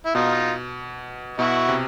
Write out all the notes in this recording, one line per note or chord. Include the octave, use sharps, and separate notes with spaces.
E4
B2 D#4 F4
B2 E4 F#4
C3